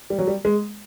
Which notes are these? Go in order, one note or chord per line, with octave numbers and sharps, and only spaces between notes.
G3
F#3
G3
G#3